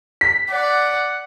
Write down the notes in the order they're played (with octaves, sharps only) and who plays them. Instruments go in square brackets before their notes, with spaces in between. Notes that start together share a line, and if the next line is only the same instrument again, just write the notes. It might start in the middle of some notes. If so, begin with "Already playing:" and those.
[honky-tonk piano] B6
[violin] D5 [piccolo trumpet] F#5